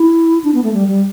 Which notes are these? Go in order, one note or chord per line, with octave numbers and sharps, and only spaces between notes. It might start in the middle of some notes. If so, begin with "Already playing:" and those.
Already playing: E4
D4
B3
A3
G3
G3